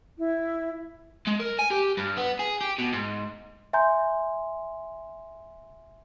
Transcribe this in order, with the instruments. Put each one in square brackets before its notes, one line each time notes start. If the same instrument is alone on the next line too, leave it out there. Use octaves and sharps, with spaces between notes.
[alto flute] E4
[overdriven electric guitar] G#3
A#4
G#5
G4
G2
B3
G#4
G4
B2
G#2
[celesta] E5 G#5 A#5 C6 G6